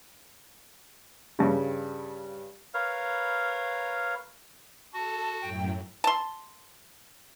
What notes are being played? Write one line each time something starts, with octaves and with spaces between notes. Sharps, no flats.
G2 C#3
A#4 B4 C#5 F5
F#4 A4 A5
F#2 A2 F#3 G5
A5 C6